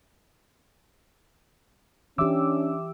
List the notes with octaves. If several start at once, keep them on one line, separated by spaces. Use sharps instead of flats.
E3 C#4 D4 G4 E5 D6 E6